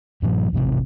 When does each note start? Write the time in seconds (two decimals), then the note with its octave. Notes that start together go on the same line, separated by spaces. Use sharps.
0.22 G2 A#2 D3 F3
0.53 E1 A1 A2 C3